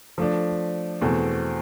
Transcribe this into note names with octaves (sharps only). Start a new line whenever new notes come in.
F3 A3 D4
E2 B2 A3 C4